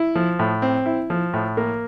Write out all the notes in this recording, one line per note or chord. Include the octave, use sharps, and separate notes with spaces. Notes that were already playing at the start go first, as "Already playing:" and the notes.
Already playing: E4
F3
A2
C4
E4
F3
A2
A#3